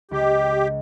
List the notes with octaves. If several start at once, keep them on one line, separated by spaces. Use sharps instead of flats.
C#2 G4